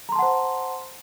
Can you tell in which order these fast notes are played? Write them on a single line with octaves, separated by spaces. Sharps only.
A#5 C6 A5 F#5 C5